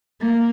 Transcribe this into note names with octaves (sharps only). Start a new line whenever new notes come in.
A#3